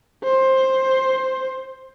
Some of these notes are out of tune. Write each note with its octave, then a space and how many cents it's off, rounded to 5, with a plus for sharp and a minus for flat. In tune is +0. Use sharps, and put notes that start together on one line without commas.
C5 +10